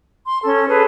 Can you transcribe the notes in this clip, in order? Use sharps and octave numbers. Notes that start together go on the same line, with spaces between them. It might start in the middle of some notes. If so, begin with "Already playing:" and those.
C6
C#4 A4
G#4 A4 B4